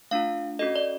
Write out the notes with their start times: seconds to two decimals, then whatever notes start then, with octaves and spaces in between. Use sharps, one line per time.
0.11 A3 D4 F4 F5
0.59 C#4 F#4 A4 D#5
0.76 D5